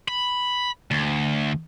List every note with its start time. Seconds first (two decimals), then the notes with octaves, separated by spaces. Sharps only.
0.08 B5
0.91 D2